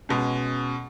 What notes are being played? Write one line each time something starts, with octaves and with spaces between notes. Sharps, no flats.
B2 G#3 C#4